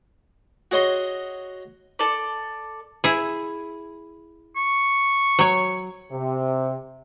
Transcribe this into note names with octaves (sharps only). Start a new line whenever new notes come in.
F#4 G#4 C#5 D#5 C6
A4 D5
E4 G#4
C#6
F#3 C#5
C3